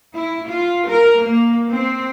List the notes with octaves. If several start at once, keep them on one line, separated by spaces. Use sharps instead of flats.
E4
F4
A#4
A#3
C4